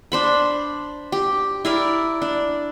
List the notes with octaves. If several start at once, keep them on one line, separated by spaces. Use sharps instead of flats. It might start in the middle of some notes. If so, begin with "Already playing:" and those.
D4 C5 B5
G4
E4 A#4 D5
D4